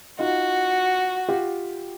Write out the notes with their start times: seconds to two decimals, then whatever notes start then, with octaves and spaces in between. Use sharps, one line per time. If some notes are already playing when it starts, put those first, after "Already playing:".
0.19 D#4 F4 F#4
1.29 F4 G4